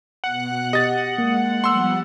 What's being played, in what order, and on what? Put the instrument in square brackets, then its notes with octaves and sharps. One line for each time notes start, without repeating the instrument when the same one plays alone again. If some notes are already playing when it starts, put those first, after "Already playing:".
[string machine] B2 F#6 [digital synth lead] F#5
[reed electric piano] G4 [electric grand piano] D#5 A6
[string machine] G#3 [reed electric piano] A#3
[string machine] F3 G3 B3 [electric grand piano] C6 E6